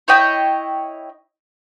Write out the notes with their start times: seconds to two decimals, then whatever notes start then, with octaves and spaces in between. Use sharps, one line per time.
0.08 E4 C#5 D#5 G5